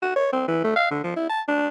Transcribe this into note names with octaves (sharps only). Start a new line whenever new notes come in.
F#4
C#5
C4
E3
A3
F5
D3
F3
E4
A5
D4